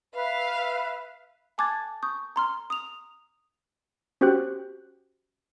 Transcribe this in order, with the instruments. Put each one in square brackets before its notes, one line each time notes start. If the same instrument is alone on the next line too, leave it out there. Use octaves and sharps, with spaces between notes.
[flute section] B4 E5 [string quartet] F5
[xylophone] G#5 A5 D6 F#6 G#6 A6
C#6 D#6 G6
A#5 C6 F6
D#6 F7
[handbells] C#4 F#4 G4 C5 G5 F#6